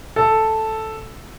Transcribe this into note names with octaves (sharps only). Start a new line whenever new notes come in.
A4